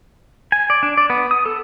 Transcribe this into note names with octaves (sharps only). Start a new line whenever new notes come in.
G#5
D5
D4
D5
B3
D#6
A4